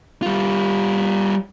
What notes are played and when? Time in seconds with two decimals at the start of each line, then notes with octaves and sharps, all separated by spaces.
0.22 G3 F4